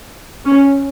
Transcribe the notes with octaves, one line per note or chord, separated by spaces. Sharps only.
C#4